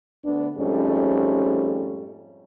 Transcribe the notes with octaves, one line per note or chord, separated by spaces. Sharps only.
D2 B3 D4
F2 G#2 G3 A3 C#4